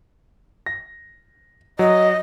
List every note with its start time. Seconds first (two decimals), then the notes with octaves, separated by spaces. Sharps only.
0.66 A#6
1.79 F#3 D#5